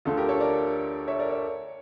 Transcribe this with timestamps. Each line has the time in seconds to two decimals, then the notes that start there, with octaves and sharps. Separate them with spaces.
0.05 D2 D3 A3 F4 A4
0.17 G4 A#4
0.29 A4 C#5
0.40 A#4 D5
1.08 C#5 E5
1.19 A#4 D5
1.30 C#5